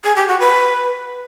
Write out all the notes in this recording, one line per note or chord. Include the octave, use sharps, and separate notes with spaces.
G#4
G4
F#4
B4